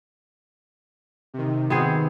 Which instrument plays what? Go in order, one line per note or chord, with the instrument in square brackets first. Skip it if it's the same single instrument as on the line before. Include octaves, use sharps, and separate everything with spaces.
[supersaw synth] C3 D#3
[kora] B3 C4 G#4